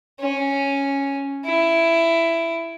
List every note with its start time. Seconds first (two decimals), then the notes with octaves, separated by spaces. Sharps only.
0.20 C#4
1.45 E4